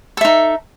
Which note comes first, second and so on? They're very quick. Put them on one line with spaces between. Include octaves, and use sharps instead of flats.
A4 E5 D#4